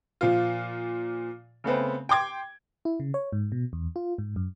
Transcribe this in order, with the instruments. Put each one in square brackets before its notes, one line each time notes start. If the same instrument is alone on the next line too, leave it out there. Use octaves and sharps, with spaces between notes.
[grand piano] A#2 F3 F4
C#3 A3 B3 C4
G5 C6 D6 G#6
[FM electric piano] E4
C#3
C#5
G#2
B2
E2
F4
G#2
F#2